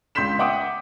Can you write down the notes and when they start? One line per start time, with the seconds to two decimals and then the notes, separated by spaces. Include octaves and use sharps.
0.15 C#2 C6 G6 B6 E7
0.39 E5 F#5 G5 D6 D#6